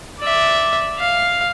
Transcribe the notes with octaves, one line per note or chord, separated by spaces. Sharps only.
D5 E5
F5